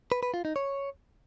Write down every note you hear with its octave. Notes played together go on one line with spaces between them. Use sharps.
B4
B4
F4
D#4
C#5